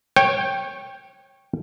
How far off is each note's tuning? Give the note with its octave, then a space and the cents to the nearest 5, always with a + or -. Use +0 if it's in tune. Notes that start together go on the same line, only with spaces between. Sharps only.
C#5 -20 G5 +5